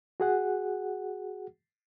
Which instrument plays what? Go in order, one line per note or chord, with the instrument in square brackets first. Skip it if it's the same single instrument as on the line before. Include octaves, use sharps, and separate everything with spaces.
[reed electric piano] F#4 G#4 F#5